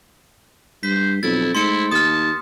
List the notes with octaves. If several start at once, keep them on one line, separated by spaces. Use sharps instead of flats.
G2 C5 B6
B1 F2 E4 A6
G#2 A3 E4 C6 C#7
D#2 A5 D#6 F6